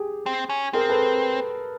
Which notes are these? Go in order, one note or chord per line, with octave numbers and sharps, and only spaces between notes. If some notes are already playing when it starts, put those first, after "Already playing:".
Already playing: G4 G#4
C4
C#4
C4 G#4 A#4
A4 B4